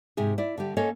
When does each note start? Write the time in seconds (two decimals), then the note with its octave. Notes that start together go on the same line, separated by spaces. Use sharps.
0.17 G#2 C3 G#4
0.38 E4 D5
0.58 D3 G3 G4
0.77 A#3 C#4 A4 C#5 D#5 F5